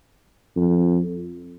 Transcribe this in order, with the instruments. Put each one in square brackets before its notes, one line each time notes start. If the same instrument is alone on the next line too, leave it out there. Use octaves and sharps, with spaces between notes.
[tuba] F2